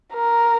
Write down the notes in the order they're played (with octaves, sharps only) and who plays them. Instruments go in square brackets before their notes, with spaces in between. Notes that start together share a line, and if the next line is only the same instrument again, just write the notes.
[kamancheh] A#4